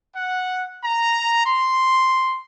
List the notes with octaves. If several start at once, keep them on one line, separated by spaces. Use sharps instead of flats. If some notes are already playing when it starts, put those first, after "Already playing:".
F#5
A#5
C6